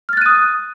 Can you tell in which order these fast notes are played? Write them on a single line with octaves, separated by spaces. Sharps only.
F6 A6 F#6 D#7 D#6